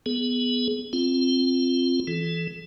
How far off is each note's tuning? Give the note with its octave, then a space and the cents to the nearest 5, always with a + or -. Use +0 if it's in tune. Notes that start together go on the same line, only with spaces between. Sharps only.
B3 +0 G#4 +20
C4 +5 F4 -5
E3 +15 A4 -35